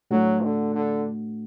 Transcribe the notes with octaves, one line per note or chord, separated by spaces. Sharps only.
A2 F#3 A3 D4 F#4
D3
D3